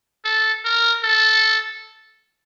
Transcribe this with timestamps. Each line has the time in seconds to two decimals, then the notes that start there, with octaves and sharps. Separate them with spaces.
0.25 A4
0.65 A#4
1.04 A4